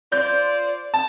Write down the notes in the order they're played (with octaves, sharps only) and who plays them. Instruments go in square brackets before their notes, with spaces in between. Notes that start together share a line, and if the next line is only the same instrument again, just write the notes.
[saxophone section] F4 C5 D5 [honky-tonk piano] G6
[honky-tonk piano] A5